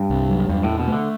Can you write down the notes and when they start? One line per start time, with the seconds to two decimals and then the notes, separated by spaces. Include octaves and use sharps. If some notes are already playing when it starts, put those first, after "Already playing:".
Already playing: G2
0.10 C2
0.29 F#3
0.49 E2 G2
0.63 A2 D4
0.79 B2
0.87 A3
0.92 D3